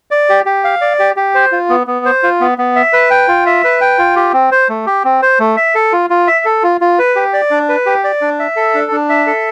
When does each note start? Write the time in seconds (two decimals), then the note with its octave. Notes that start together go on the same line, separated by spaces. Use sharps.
0.11 D5
0.29 G4
0.46 G4
0.64 F5
0.81 D5
0.99 G4
1.16 G4
1.35 C5
1.52 F4
1.69 B3
1.87 B3
2.05 C5
2.23 F4
2.40 B3
2.58 B3
2.76 E5
2.93 B4
3.10 G5
3.28 F4
3.46 E5
3.64 B4
3.81 G5
3.98 F4
4.16 G4
4.33 C4
4.51 C5
4.69 A3
4.86 G4
5.04 C4
5.22 C5
5.40 A3
5.57 E5
5.75 A4
5.92 F4
6.10 F4
6.27 E5
6.45 A4
6.63 F4
6.81 F4
6.99 B4
7.16 G4
7.33 D5
7.50 D4
7.69 B4
7.86 G4
8.04 D5
8.21 D4
8.39 E5
8.56 A4
8.74 D4
8.92 D4
9.09 E5
9.27 A4